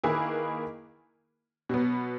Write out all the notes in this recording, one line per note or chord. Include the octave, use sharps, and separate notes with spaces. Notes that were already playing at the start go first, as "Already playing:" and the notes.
D#3 A#3 E4 G#4 B4
B2 F#3 B3